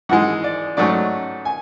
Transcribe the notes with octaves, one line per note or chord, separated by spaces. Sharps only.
G#2 E3 G#3 F#5
D5
G#2 F#3 A3 C#4 D5
G#5